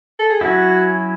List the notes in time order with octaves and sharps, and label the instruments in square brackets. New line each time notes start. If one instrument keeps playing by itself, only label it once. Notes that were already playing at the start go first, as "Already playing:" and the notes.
[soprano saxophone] A4
G#4
[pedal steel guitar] F#3 C#4 E4 [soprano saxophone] F#4